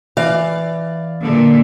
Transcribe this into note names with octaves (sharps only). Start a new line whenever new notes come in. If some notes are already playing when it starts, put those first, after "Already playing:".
E3 D5 F5
A#2 D3